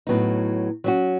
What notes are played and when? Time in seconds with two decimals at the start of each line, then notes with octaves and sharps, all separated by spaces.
0.07 A2 F#3 B3 D#4
0.84 F#3 C#4 F#4